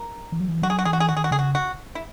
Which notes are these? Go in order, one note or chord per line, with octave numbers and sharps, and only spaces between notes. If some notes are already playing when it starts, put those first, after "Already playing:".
Already playing: A#4
E3
F#3
E3
F#3 F#4
G#4
F#4
E3 G#4
F#4
G#4
D#3 F#4
G#4
F#4
C#3 G#4
F#4
F#4
E4